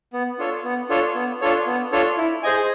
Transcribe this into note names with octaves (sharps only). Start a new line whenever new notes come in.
B3
D4 F4 A4 C#5
B3
D4 F4 A4 C#5
B3
D4 F4 A4 C#5
B3
D4 F4 A4 C#5
E4
G#4 C5 D#5 G#5